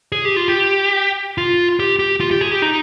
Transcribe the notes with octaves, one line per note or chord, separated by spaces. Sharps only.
G#4
G4
F4
G4
F4
G4
G4
F4
G4
G#4
G4
D#4